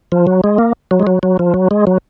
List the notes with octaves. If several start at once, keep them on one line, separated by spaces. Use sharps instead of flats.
F3
F#3
G#3
A#3
F#3
G#3
F#3
F#3
F3
F#3
G#3
F#3